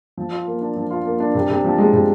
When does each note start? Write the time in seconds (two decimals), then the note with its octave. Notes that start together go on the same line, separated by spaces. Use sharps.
0.17 F3
0.32 F4
0.47 A#3
0.61 D4
0.76 F3
0.91 F4
1.05 A#3
1.20 D4
1.35 C3
1.50 C3
1.64 F3
1.78 G#3
1.93 C3